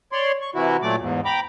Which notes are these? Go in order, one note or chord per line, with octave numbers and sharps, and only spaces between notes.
C#5 D5 C6
C#6
C3 E3 E4 F#4
A#2 F#3 A3 D5 D6
E2 G#2
G5 A#5 B5 D6